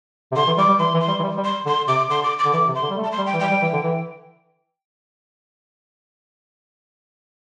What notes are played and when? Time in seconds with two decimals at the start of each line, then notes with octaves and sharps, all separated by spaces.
0.32 C3
0.36 D3 C6
0.47 E3
0.58 G3 D6
0.68 G3
0.79 E3 C6
0.94 E3
1.01 C6
1.08 G3
1.19 E3
1.23 G3
1.37 G3
1.45 C6
1.66 D3 C6
1.88 C3 D6
2.09 D3 C6
2.24 D6
2.39 D6
2.45 D3
2.53 E3 D6
2.68 C3
2.75 C6
2.82 D3
2.90 G3
2.97 A3
3.04 A5
3.12 C6
3.18 G3
3.26 G5
3.34 E3
3.40 G3 G5
3.51 G3
3.62 E3
3.73 D3
3.84 E3